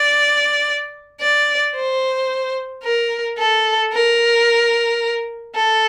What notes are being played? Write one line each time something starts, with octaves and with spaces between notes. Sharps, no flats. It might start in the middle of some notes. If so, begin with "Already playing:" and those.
Already playing: D5
D5
C5
A#4
A4
A#4
A4